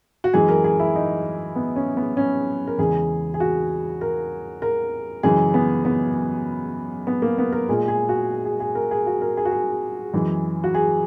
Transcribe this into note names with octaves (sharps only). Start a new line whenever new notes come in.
F#4
F#2 E3 G#3 G#4
A#4
G#4
E4
D#4
B3
C#4
B3
C#4
A#4
E2 C#3 E3 G#3 G#4
G#4
F#4
A#4
A#4
F#2 C#3 E3 G#3 G#4
B3
B3
B3
A#3
B3
A#4
A#2 G#3 G#4
G#4
F#4
G#4
G#4
A#4
G#4
F#4
A#4
G#4
F#4
G#4
F#2 E3 G#3
F#4
G#4